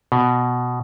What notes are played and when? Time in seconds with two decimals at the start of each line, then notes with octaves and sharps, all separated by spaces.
0.12 B2